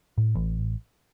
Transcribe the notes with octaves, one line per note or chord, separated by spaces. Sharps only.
A2
A1